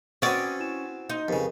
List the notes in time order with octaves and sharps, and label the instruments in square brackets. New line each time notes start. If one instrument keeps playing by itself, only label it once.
[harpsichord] C4 F#4 B4 [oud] C#4 D5 [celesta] D#6 A6
[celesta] E4 G#5 E7
[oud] D#4 [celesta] C6 G6
[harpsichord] F2 C#3 [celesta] G4 A#4 B4